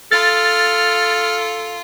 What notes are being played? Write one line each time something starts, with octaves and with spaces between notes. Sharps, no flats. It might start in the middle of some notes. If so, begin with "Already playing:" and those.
F4 A4 F6 A6